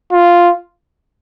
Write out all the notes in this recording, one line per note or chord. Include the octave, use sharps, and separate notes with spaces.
F4